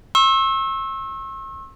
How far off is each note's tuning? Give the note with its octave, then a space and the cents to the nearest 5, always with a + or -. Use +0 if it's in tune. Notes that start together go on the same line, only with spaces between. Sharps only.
C#6 -45 E6 -10